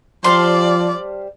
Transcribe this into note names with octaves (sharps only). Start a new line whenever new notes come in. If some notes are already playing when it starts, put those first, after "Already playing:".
F3 G3 C5 D5 F5 A5 C6